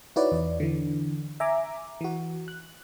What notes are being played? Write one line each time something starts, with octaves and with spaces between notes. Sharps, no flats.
D#4 E4 F#4 B4 C#5 D5
E2 D5
D3 E3
E5 G#5 A#5 D6
E3 F#4
F#6